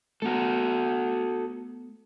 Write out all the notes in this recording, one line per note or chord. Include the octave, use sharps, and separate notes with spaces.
A3 B3 F#4 A4 A#5